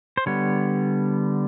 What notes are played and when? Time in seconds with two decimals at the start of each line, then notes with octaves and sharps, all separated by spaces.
0.17 C5
0.26 D3 G3 B3 C#5